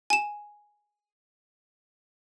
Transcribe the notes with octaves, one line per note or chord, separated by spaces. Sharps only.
G#5 E7